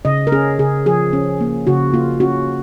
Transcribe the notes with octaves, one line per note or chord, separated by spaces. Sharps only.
C#3 D#5
A#4
C#4 G#4
C#3 G#4
F3 G#4
C#4
A#3
C#3 F#4
A#3 F4
C#4 F#4